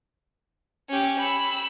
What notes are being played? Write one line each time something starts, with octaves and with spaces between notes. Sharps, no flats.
C#4 G4
B5 E6